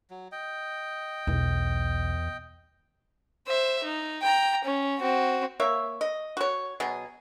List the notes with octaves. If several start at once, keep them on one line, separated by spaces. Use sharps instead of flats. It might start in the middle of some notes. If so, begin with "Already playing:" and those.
F#3
D#5 G5
B1 E2
C5 E5
D#4
G5 A#5
C#4
C4 F#4
A#3 C#5 E5
D#5
F#4 C#5
B2 F#3 G#4